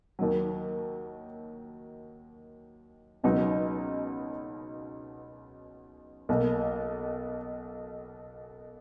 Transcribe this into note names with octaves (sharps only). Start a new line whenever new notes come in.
D#2 D#3 F#3
C#2 B2 F#3 B3 D#4
B1 B2 A#3